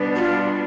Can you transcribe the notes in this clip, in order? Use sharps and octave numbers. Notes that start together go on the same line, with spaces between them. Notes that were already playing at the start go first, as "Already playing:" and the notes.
Already playing: B2 G3 B3 D4
F#4
F4